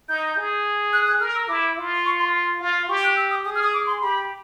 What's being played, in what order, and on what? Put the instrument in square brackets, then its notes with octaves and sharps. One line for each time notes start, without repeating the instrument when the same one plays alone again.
[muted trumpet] D#4 [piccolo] G6
[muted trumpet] G#4
[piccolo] F#6
F#6
[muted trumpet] A#4 [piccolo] F6
[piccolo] E6
[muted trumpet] E4 [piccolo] D6
[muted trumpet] F4
[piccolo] C#6
C6
[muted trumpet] F4
[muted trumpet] G4 [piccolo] C#6
[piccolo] F#6
E6
D#6
[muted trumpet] G#4 [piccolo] D#6
[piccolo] F6
D#6
D6
C6
[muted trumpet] G4 [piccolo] B5